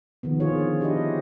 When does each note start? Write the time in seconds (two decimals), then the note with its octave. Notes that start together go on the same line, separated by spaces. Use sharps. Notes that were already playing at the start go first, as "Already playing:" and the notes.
0.23 D#3 F3 B3
0.40 D3 F4 G#4 C#5
0.81 D4 E4 G4 B4 C5 D#5